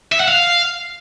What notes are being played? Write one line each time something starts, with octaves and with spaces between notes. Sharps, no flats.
E5
F#5
F5